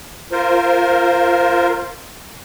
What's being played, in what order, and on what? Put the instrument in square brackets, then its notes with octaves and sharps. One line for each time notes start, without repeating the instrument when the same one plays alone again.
[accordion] F4 A#4 C5